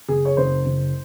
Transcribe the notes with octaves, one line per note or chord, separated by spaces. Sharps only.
F#1 G#4
C#5
F#1 C5
F#1